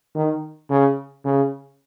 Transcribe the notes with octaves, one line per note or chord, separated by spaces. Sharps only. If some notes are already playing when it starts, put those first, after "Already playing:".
D#3
C#3
C#3